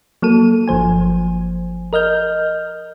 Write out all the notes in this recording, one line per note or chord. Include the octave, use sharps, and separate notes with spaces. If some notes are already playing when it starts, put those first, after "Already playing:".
F#3 A#3 A4 D#7
G1 F3 C5 G#5
A#4 D#5 F6 G6